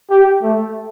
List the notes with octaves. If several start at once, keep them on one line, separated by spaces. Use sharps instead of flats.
G4
A3